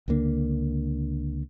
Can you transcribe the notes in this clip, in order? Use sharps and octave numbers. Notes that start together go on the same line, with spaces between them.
C#2 D3 A#3 D4